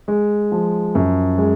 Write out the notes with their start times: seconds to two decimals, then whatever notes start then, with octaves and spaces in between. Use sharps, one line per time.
0.08 G#3
0.52 F3
0.95 F#2
1.38 G#3